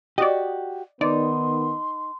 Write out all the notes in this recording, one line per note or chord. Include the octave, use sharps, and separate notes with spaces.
F#4 G4 D5 D#5
D#3 B3 D#4 D5 C6